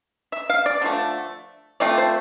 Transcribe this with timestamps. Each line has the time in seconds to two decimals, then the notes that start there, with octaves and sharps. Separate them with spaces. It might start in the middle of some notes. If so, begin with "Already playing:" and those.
0.32 E5
0.50 F5
0.66 D5
0.82 D3 F3 A3
1.80 F3 A3 C4 F4 D5
1.98 C5